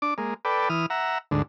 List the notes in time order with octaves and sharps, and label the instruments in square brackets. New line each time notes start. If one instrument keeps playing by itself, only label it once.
[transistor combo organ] D4 D6
G#3 A#3
A4 B4 D5 G5
E3 D#6 F6
E5 F#5 A#5
D2 G#2 D3